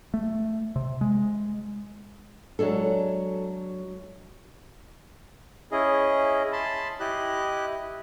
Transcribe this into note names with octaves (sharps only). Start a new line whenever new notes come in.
A3
C3
G#3
F#3 G#3 D4 A4
C#4 E4 G#4 D#5
A5 B5 C6
E4 G4 D#5 F#6